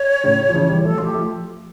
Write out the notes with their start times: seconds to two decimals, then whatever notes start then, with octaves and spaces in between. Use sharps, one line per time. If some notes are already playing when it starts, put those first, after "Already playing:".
Already playing: C#5
0.24 A2 C#3
0.49 F3
0.54 C#3 E3
0.69 E3 G3
0.84 F3 A3 A4
0.98 F3 A3 F4
1.04 G4
1.14 F3 A3